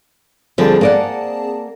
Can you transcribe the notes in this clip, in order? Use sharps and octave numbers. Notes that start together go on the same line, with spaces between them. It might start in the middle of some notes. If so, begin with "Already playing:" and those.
D3 F3 G3 C4 G#4 A5
A#3 D5 F#5